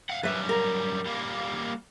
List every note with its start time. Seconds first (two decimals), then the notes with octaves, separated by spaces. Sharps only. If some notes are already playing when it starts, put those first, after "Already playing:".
0.09 F5 F#5
0.23 F#2 G3 B4 E5
0.49 A#4
1.06 G3 A#3